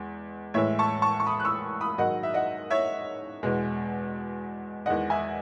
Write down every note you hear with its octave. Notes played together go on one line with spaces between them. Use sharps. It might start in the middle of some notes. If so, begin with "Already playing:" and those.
Already playing: E2 G#3
A2 E3 G#3 C#5 E5
A5 C#6
A5 C#6
C#6
B5 D#6
F#6
C#6 E6
B5 D#6
G#2 D#3 F#3 D#5 F#5
E5
D#5 F#5
C#5 E5
E2 B2 G#3
E2 D#3 G#3 D#5 F#5
E5 G#5